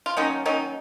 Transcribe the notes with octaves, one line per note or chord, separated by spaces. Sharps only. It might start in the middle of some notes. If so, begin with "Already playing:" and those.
F4
D#3 F#3 A#3 C#4 D#4
D#3 F#3 A#3 C#4 D#4